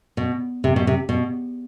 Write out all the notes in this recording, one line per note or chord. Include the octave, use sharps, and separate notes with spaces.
B2
C3
B2
C3
B2